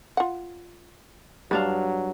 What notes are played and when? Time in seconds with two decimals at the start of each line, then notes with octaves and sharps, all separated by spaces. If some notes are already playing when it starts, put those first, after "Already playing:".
0.17 F4 F#5
1.51 G2 F#3 D4 F5